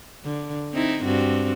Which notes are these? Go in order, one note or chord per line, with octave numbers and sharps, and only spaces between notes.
D3
C4 D#4 E4
G2 C4 F#4